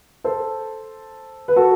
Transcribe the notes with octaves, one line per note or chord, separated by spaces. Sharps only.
A4 C5
B4
F#4 A4